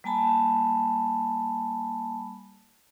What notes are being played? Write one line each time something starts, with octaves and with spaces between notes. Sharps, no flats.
G3 A#3 G#5 A5 B5